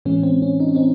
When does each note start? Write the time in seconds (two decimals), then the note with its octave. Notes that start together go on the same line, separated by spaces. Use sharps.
0.05 A2 E3 G#3 C#4
0.23 C4
0.42 C#4
0.60 D#4
0.68 C#4
0.75 C4 D#4